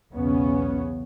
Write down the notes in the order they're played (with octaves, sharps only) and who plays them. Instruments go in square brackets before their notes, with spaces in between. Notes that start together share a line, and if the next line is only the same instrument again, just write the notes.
[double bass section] B1 E2 C#3 B3 C#4